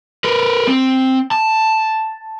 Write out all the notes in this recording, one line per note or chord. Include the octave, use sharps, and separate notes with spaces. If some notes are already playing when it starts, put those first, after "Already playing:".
A#4 B4
C4
A5